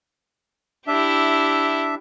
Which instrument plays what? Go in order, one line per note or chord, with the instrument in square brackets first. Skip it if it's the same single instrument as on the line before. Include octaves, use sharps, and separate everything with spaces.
[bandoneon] D4 E5 [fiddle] E4 G4